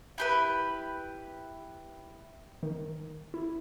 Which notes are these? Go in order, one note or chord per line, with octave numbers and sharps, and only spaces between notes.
E4 G4 B4
D#3
E4